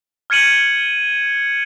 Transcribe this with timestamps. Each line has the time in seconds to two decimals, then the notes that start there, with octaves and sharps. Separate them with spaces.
0.30 F6 G#6 C#7 D#7 F#7